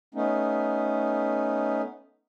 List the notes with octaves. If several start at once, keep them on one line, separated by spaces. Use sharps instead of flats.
A3 B3 C#4 D#4